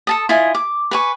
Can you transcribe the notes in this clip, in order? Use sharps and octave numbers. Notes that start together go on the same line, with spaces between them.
A4 A5 D#6
E4 F4 D#5 G#5
D6
B4 G#5 C#6